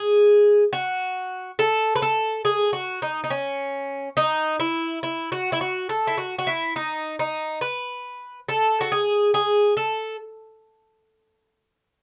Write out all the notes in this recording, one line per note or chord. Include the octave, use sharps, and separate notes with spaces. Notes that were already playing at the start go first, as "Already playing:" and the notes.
Already playing: G#4
F#4
A4
B4
A4
G#4
F#4
D#4
D#4
C#4
D#4
E4
E4
F#4
E4
F#4
A4
E4
F#4
F#4
E4
D#4
D#4
B4
A4
F#4
G#4
G#4
A4